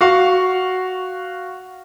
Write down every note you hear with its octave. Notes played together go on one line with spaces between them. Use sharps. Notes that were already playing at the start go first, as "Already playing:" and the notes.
F#4 F5 C#6